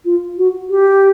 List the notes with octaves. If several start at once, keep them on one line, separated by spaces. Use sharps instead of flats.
F4
F#4
G4